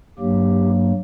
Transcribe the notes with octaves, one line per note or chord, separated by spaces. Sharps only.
G2 F#3 A#3 G4